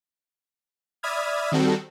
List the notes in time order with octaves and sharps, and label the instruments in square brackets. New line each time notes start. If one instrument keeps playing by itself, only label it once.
[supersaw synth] D5 E5 B5 D#6 F6 G#6
D#3 G3 C4 F#4 A4